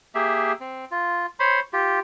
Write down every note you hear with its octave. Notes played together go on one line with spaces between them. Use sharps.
A#3 G4 G#4 E5
C4
F4
C5 C#5 B5 C6
F4 G4